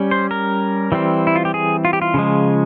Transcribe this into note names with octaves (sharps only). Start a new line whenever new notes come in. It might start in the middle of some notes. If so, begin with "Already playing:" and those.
Already playing: G3 C#4
C5
A#4
E3 G3 C4
E4
F4
G4
G#4
F4
G4
F4
C#3 F3 G#3